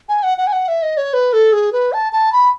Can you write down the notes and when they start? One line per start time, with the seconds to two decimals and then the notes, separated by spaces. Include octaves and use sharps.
0.09 G#5
0.23 F#5
0.38 F#5
0.47 G#5
0.53 F#5
0.68 E5
0.83 D#5
0.97 C#5
1.14 B4
1.33 A4
1.53 G#4
1.73 B4
1.93 A5
2.13 A5
2.33 B5